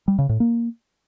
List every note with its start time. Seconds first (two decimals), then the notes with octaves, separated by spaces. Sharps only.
0.08 G3
0.19 C#3
0.29 A2
0.40 A#3